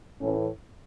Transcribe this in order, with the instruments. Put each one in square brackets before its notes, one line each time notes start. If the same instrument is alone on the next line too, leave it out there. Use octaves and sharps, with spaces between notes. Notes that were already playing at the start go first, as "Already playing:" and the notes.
[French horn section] A2 E3 C#4